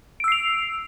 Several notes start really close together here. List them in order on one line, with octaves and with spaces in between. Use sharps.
D7 E6 C7 F7